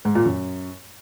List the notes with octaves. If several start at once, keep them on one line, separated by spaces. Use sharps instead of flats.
G#2
A#2
F#2